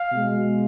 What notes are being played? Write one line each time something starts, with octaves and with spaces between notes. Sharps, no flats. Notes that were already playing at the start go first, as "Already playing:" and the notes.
Already playing: F5
B2 G#3